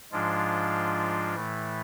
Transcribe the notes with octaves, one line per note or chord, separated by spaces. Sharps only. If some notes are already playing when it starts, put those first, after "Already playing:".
G#2 F3 G#3 D4 F4
A2 E3 A3